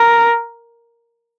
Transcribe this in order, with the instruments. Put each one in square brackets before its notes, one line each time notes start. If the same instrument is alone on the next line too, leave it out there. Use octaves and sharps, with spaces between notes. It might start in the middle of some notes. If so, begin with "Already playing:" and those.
Already playing: [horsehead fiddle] A#4